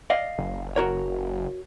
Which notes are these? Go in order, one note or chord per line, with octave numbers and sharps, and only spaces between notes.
D5 D#5 F5
F#1
F#4 A#4 C#5